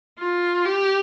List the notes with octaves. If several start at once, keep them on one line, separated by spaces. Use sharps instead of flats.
F4
G4